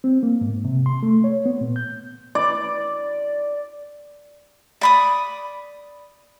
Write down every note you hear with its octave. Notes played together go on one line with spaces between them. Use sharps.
C4
A#3
G#2
C3
C6
A3
C#5
B3
A#2
G6
D5
D5 B5 D#6